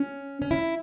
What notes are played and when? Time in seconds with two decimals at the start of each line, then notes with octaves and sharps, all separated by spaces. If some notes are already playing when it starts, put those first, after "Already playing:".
Already playing: C#4
0.42 C#4
0.51 E4